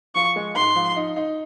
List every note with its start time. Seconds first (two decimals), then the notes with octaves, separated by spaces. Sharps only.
0.15 F3 C#6
0.36 G#3
0.56 G#2 C6
0.75 F3
0.96 D#4
1.16 D#4